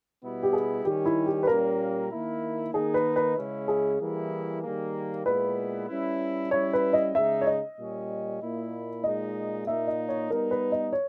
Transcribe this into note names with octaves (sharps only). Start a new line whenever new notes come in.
B2 G3 B3 E4
G4
G#4
D#3 G3 C#4 G4
E4
G4
B4
A#2 G3 A#3 C#4 A#4
D#3 A#3 E4
D#3 A#3 D#4 G#4
B4
B4
C#3 G#3 C#4 E4
G#4
E3 G3 A#3 E4
D#3 G3 A#3
A#2 G#3 B3 E4 B4
G3 C#4 E4
G3 C#4 E4 C#5
B4
D#5
C#3 G#3 D#4 E5
C#5
D#5
A#2 G3 C#4
A#2 A#3 E4
A#2 G#3 D#4 D#5
A#2 A#3 D#4 E5
D#5
C#5
G3 B3 D#4 A#4
B4
D#5
C#5